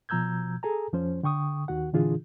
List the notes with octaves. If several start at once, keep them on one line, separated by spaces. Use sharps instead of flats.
B2 F3 A#5 E6 G6 G#6
G#4 A4 G#5 A#5
F2 F3 C#4 C5
D3 G5 C#6 D#6
D#2 D#3 F#4 F#5
A#2 D3 E3 D4 F4 G#4